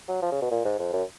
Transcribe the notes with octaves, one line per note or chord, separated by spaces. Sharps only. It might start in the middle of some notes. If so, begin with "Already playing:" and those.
F#3
F3
C#3
B2
A#2
G#2
F2
F#2